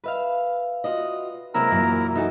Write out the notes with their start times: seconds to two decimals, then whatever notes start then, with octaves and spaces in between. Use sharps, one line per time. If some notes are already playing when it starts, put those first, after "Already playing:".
0.04 B4 E5 F5
0.84 F4 F#4 D#5
1.54 F#2 C3 G#3 A#3 E4 A#4 A#5 E6
1.72 F#2 A#2 E3
2.15 D#4 F#4 A4 E5 G#5